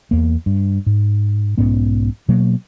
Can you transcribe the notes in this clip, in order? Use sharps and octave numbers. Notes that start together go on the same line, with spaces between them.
E2 A#3
G2
G#2
B1 G#2 B3 C#4
B2 F#3 A#3